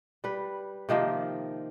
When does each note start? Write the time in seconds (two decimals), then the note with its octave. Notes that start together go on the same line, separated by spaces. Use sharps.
0.24 G3 B4
0.89 C3 D#3 F3 A#3